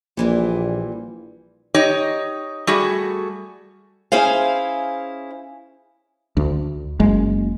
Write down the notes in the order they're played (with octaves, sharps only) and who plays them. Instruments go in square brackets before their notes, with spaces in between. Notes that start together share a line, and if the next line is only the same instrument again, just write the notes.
[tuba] A#1 [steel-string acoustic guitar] A#2 E3 G3
[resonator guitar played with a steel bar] D#4 G4 C#5 D#5
G3 A3 F#4 G#4
[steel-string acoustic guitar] C#4 E4 G#4 C5 F5
[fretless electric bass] D2
F#1 G#3